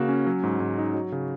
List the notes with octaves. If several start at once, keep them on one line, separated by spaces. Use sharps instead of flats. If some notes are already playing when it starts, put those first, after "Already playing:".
Already playing: C#3 A#3 F#4
C#4
F#3
G#2
G#2
D#4
F#3
C#3